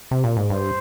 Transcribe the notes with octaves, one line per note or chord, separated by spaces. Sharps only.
C3
A#2
G#2
G2 C5